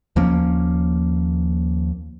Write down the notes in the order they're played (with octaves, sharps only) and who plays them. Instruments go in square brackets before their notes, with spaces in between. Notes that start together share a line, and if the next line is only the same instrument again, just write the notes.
[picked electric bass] D#2 F3 A#3 C#4